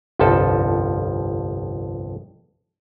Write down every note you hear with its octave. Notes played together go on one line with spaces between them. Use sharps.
G1 C2 F2 F3 A4 A5